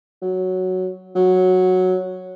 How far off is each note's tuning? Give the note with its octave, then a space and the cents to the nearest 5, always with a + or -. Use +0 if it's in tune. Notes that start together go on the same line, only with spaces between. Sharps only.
F#3 +0
F#3 -5